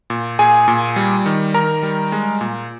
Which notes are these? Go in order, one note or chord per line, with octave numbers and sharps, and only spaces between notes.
A#2
A#2 G#4 G#5
A#2
G3
D#3
D#3 A#4 A#5
G3
G#3
A#2